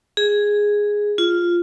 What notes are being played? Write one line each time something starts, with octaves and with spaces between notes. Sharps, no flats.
G#4
F4